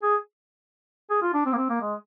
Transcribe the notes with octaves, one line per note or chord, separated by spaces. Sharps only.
G#4
G#4
F4
D4
C4
A#3
C4
A#3
G#3